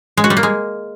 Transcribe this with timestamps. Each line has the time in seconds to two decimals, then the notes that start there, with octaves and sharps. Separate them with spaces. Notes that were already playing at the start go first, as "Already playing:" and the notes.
0.17 G#3
0.24 F#4
0.30 G3
0.37 A#3
0.43 G#3